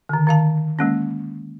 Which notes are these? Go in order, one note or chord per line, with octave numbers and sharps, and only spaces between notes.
D3 D#3
D#3 F5 A5
G#3 A#3 C#4